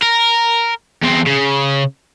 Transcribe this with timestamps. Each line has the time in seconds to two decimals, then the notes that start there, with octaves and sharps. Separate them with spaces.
0.02 A#4
1.03 E2 C4
1.27 C#3